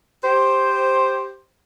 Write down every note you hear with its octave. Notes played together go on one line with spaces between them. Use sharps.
G4 C5